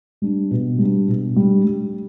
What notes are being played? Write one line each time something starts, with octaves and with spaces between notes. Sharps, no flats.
G3 D4
B2
G3 D4
B2
G3 D4
G3